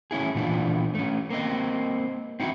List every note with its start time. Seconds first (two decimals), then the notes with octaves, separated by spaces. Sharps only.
0.11 A3 C#4 E4 G#4
0.35 A#2 E3 F3 D4
0.95 A3 C#4
1.30 A#3 C4 D#5
2.40 C4 D#4 E4 F#4